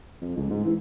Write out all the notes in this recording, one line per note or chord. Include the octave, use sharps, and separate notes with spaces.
F2
C#2
G#2
E3